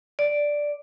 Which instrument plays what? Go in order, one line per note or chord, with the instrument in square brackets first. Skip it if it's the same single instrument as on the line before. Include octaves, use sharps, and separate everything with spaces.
[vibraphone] D5